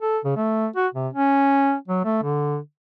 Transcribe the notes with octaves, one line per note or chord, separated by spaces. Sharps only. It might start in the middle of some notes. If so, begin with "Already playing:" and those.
A4
C#3
A3
F#4
C3
C#4
F#3
A3
D3